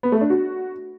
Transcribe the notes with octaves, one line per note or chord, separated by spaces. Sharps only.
B3
A3
D4
F#4